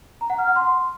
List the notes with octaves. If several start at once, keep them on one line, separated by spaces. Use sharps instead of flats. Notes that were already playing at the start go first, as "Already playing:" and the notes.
A#5
F#5
F6
F#5
C6